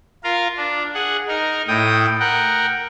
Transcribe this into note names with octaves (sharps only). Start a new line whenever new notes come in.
F4 A#4 F5
D4
G#4 F#5
D#4 A#4
A2 G5 D#6
A#4 F#5 G5